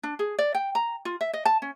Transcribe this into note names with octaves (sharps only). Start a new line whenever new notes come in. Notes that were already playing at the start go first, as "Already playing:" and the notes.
D4
G#4
D5
G5
A#5
F4
E5
D#5
A5
C#4